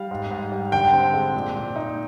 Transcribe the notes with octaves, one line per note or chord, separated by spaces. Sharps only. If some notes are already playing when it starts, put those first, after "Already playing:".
Already playing: G3 F5
G#2
G#2
G3
D3 G5
C4
G#3
A#2
A#2
D#4